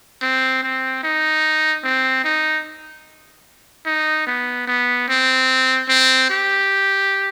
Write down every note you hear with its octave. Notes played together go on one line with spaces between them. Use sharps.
C4
C4
D#4
C4
D#4
D#4
B3
B3
C4
C4
G4